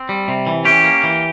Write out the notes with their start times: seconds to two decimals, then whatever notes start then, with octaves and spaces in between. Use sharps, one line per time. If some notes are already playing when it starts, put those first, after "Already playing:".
Already playing: C4
0.09 G3
0.28 C3
0.47 E3
0.65 C#4 G4
0.84 A#3
1.03 E3